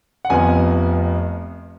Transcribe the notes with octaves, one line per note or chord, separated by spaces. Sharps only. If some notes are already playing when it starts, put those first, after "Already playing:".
F#5
F1 F2 F3 B3 G#5